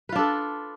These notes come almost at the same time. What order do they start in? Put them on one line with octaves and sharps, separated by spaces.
B4 F4 D4 A4